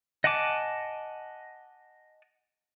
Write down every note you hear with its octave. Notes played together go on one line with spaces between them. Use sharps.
D#5 F#5 G#5 A5 D6